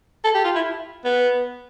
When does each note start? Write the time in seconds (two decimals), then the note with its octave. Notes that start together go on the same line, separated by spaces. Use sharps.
0.24 A4
0.34 G4
0.44 F4
0.55 E4
1.05 B3